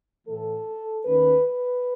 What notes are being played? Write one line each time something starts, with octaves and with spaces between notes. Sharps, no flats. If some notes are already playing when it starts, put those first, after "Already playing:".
A2 E3 A3 A4
D#2 D#3 A3 C#4 B4
B4